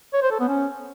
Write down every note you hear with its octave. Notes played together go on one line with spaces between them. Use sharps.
C#5
C5
A4
B3
C#4